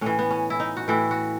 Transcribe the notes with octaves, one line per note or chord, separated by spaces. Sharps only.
A2 E3 C#4
B3
C#4
E4
D#4
F#4
A2 E3 E4
F#4